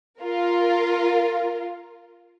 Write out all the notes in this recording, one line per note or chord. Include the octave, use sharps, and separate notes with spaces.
F4 A#4